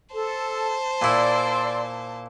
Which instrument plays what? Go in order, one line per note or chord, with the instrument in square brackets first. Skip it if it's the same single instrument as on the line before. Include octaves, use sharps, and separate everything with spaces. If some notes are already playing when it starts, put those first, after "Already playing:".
[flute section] A4 [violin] C5 A5
[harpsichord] A#2 E4 [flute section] D5 C6 E6